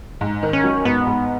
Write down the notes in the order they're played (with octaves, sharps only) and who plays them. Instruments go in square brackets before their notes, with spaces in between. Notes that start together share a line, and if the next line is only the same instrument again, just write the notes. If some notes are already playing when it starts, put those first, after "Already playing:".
[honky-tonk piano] G#2
D#3
[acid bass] C#4
[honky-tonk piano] F#3
[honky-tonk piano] G#2 [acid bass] B3
[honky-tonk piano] G#2